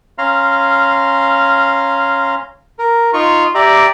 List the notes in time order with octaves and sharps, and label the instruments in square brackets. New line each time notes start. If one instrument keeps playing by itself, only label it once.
[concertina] C#4 F5 A#5 C6 F6
A#4
[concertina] D#4 C#6 [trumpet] F4
[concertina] G4 E5 A#5 [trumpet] D5